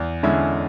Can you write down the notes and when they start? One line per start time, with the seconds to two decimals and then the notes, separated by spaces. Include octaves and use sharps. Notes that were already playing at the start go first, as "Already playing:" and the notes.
Already playing: E2
0.23 D3 G#3 C#4 E4